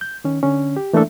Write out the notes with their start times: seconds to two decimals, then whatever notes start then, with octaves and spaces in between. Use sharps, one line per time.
0.01 G6
0.24 D#3 C#4
0.43 D3 C#4
0.76 G4
0.93 E3 A3 A#3 D4 A4 E5